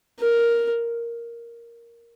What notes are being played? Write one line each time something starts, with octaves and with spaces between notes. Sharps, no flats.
A#4